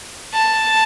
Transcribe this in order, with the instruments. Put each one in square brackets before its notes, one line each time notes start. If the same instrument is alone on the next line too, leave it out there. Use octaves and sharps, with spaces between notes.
[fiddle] A5